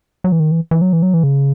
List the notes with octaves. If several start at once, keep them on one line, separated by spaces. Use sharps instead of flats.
F#3
E3
D#3
E3
E3
F#3
E3
F#3
E3
C#3